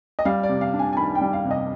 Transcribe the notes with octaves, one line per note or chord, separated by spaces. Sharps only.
D#5
G3 F5
D5
C3
F5
D4
G#5
G#5
D#3 B5
G5
G3
F5
C3
D#5